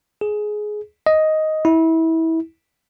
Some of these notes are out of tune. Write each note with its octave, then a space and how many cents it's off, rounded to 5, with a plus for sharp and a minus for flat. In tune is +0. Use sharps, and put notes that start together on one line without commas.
G#4 +15
D#5 +5
E4 -25